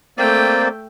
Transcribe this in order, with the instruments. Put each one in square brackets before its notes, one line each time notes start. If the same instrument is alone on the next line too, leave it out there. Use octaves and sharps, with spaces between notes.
[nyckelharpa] A3 G5 [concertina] A#3 C4 D5